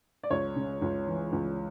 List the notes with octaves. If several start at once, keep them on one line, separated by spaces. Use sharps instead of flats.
D5
C#2 C#5
C#3
C#2
E3
C#2